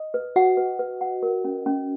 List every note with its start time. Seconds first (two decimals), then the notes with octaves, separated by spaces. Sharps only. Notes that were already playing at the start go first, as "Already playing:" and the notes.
Already playing: D#5
0.14 B4
0.36 F#4 F#5
0.57 B4
0.79 B4
1.01 F#5
1.23 A#4
1.45 C#4
1.66 C#4